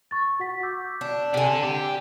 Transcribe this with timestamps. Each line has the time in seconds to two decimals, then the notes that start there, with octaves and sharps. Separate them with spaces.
0.11 C#6 A6
0.39 F#4 F#5 B6
0.63 D6 E6 G6
1.01 D4
1.34 C3 D4 A4 G#5
1.64 G4